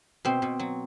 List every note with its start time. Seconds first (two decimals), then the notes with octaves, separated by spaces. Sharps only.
0.25 B2 C4
0.42 B2
0.59 F#3